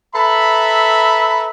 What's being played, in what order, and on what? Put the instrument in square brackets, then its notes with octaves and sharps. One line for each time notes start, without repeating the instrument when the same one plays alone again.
[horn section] A4 B4 E5 A#5 B5